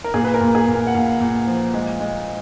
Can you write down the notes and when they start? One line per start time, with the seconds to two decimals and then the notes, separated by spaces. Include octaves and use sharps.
0.04 A#4
0.14 A#2 G#4
0.24 B4
0.34 A#4
0.41 A#2
0.55 G#4
0.67 A#2
0.74 A#4
0.87 F#5
0.94 A#2 F5
1.20 A#2
1.47 F3
1.74 G#3
2.00 G#3